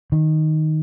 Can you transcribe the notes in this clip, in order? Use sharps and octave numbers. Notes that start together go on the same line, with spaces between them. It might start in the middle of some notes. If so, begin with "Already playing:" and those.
D#3